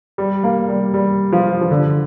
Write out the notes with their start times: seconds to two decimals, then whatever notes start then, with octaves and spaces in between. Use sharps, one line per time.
0.18 G3
0.44 A#3
0.69 G3
0.94 G3
1.33 F3
1.61 F3
1.71 D3